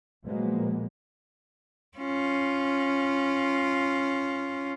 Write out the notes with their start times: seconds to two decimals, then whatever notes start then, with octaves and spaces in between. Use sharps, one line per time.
0.25 A#2 F3 F#3 G#3 A#3 B3
1.98 C#4 F4